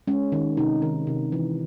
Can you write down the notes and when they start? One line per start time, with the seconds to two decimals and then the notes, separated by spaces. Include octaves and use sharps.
0.07 G#3 C#4
0.32 D#3
0.57 C3 D#4
0.82 D#3
1.07 C3
1.32 E3